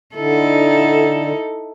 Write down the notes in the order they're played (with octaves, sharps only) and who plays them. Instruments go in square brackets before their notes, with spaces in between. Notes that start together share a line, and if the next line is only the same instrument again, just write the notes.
[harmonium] D3 [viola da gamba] D#4 E4 A4